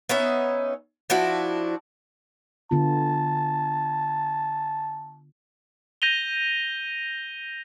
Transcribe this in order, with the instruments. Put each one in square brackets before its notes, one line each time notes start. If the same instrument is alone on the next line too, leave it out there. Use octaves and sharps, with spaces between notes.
[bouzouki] B3 C#4 D#4 E5
F3 D4 E4 F#4
[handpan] D3 B3 F4 [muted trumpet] A5
[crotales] G6 A#6 D#7 F7 G7